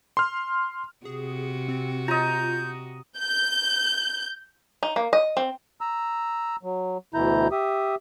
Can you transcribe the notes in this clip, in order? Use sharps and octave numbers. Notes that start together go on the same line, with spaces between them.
C6 F6
C3 F#4 G#4
C4
F4 D#5 A#5 G6
G6
D#4
A#3
D#5
C4
A#5 E6
F#3
D2 B2 E3 E4 A#5 G6
G4 E5 D#6